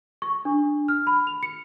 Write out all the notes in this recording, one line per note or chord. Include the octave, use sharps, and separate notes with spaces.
C#6
D4
F6
B5
F7
C#7